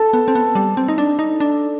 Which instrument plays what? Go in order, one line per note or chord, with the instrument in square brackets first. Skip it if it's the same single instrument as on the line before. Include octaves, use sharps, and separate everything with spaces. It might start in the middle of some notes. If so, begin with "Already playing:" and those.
Already playing: [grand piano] A4 A5
[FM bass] B3
C4
B3
G3
C4
D#4
D4
D#4
D4